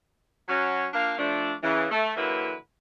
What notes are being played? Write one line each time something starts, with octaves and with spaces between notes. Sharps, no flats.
F#3 C#4 F#4
A#3 D4 F4 F5
F3 A3 D4
C#3 E3
A3
D3 E3 F#3 A#3 E4 B4